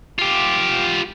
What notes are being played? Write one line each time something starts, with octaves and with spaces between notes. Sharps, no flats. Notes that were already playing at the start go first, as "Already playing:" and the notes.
F4 G4